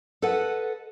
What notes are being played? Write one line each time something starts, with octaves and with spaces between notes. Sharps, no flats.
A4 B4 D#5 F#5 A5